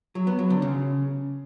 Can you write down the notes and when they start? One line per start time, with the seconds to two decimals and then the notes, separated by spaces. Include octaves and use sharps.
0.15 F#3
0.27 B3
0.39 F#3
0.50 D3
0.62 C#3